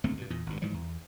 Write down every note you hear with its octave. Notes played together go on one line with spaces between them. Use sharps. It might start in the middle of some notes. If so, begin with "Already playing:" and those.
G#1 D2 A3 C4
G2 B2
E2 A#2
G#1 G2
G#2 E3 F3 G3
E2